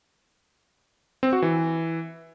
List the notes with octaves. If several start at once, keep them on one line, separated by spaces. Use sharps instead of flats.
C4
F#4
E3